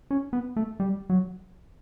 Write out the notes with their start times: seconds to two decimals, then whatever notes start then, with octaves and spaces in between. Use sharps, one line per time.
0.11 C#4
0.33 B3
0.56 A3
0.80 G3
1.10 F#3